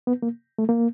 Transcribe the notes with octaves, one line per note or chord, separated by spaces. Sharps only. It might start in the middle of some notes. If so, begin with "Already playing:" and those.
B3
A#3
A3
A#3